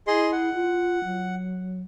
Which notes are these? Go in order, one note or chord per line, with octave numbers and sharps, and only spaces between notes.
E4 G#4 D#5 C6
F#5
F4
F#3